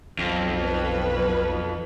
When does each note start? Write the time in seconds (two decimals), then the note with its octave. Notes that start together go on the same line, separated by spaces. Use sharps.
0.19 B1 F2
0.64 B4